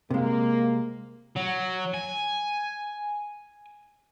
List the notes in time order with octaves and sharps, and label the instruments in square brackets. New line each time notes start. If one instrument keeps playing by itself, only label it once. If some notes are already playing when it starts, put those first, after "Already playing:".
[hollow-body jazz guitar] C3 G#3 [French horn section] A#3
[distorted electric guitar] F#3
G#5